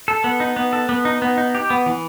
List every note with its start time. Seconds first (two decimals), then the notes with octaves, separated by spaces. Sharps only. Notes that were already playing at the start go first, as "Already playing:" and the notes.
0.08 A4
0.24 B3
0.40 D#4
0.56 B3
0.73 A4
0.89 B3
1.05 D#4
1.22 B3
1.38 D#4
1.55 G4
1.70 B3
1.86 E3